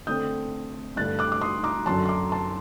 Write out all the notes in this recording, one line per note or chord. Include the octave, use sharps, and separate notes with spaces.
D3 A3 C4 D#6 G6
G2 D3 A3 F#6 A6
D6 F#6
D6
C6 D#6
A#5 D6
F#2 D3 F#3 A5 C6
C6
A#5 D6
A5 C6